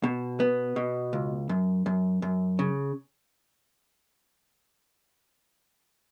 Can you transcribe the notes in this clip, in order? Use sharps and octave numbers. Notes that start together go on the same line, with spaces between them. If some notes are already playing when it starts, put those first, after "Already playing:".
B2
B3
B2
C#2
F#2
F#2
F#2
C#3